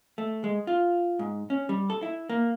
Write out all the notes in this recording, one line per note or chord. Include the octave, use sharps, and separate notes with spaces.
A3
G#3
F4
G#2
C#4
G3
A4
E4
A#3